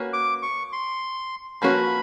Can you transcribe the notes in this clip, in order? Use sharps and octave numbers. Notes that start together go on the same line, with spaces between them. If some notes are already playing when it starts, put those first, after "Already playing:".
Already playing: A#3 C#4 F#4 B4
D6
C#6
C6
F3 A#3 C#4 F#4 B4 B5